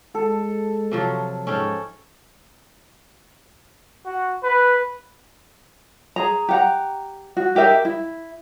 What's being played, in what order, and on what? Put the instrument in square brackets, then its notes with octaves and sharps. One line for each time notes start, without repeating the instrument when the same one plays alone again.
[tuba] G#3 [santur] A4
[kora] C3 F3 F#3
[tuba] G#2 [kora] C#4 A4 G5
[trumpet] F#4
B4
[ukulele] G#4 A#5
G4 F#5 A#5
F#4
D#4 G4 A#4 E5
E4